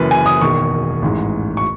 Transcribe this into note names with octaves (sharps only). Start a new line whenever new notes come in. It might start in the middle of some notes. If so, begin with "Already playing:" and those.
Already playing: F#1 F#2 E3 B4
G#5
D#6
E1 E2 D#3 C#6
A1 G#2 E3
C#6